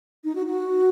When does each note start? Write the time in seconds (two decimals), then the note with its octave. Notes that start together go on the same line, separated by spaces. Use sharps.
0.24 D#4
0.35 F#4
0.46 F#4